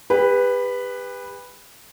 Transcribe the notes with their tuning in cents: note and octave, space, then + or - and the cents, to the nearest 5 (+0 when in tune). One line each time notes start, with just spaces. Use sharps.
G4 +40 B4 +0